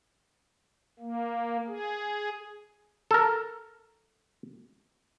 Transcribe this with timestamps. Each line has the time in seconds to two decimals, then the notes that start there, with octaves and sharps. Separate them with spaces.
0.99 A#3
1.67 G#4
3.11 A4 A#4